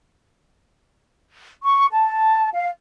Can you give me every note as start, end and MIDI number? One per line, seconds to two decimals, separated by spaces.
1.63 1.85 85
1.91 2.49 81
2.54 2.69 77